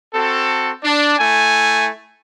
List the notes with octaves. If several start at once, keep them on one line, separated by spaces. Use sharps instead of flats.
C4 F#4 A4
D4
A3 E4 G#5